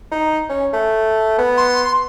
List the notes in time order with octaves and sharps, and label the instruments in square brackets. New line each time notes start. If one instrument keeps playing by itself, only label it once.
[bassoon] D#4
C#4
A3
B3
[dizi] C6